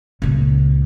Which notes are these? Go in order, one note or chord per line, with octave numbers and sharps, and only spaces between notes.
C#2 A#2